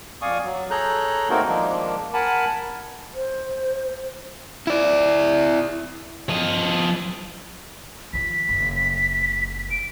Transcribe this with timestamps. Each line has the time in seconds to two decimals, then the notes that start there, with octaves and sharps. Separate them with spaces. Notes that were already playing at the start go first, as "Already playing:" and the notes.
0.22 F2 D5 F5 G#5 C#6 D#6
0.44 F#3
0.71 G#4 A4 C#5 A#5 F#6 G6
1.30 A3 A#3 C4 D#4 F#4 A#4
1.48 D#3 F3 G#3 A#3 D4
2.13 A#4 F#5 G#5 A5 B5
3.15 C5
4.67 E4 D5
6.29 F3 D#5
8.13 D#3 F3 B6
8.49 F#1
9.71 D7